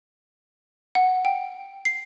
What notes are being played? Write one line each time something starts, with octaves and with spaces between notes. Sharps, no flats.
F#5
G5
C7